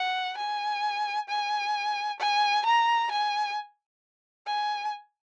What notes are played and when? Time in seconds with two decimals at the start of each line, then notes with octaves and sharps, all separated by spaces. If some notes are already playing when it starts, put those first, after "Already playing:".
Already playing: F#5
0.38 G#5
1.29 G#5
2.20 G#5
2.66 A#5
3.11 G#5
4.47 G#5